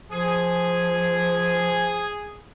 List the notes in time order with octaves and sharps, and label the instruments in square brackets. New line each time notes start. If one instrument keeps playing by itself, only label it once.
[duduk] F3 [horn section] G#4